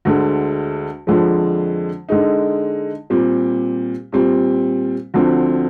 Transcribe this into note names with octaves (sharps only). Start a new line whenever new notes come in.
D2 D3 G#3
F2 D3 F3 G#3
D3 G#3 D#4
A#2 G3 C4 G4
A#2 G3 C4
D2 D3 F3 C4